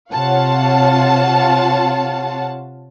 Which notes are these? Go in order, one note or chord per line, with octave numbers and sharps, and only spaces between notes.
C3 F4 C#5 F5 F#5 A5